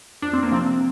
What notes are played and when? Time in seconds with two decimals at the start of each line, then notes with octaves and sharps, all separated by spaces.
0.22 F2 D4
0.33 C4
0.43 A#3
0.51 C3 F3 C4